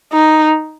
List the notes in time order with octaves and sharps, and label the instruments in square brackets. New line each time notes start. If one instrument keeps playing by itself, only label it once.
[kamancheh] D#4